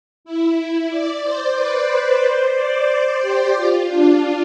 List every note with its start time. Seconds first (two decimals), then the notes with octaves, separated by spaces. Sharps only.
0.25 E4
0.58 E4
0.90 D5
1.23 C5
1.56 B4
2.22 C5
2.55 D5
2.88 C5
3.21 G4
3.54 F4
3.88 D4